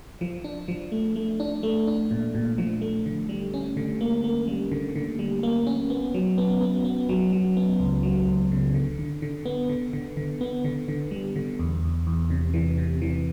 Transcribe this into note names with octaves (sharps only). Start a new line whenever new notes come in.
F3
D4
F3
A3
A3
D4
A3
D4
A#2
A#2
F3
A3
D3
G3
C#4
D3
A#3
A#3
G3
D3
D3
G3
A#3
C#4
B3
F#3
B3
B3
B3
F#3
F#3
B3
C#2
F#3
C#2
C#3
D3
D3
D3
B3
D3
D3
D3
B3
D3
D3
G3
D3
E2
E2
E2
C3
E3
C3
E3